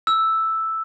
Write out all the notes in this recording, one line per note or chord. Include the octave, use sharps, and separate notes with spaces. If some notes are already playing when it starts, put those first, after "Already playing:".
E6